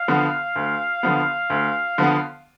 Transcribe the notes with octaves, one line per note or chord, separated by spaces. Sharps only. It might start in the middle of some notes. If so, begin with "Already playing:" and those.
Already playing: F5
D3 F3 B3
D2
D3 F3 B3
D2
D3 F3 B3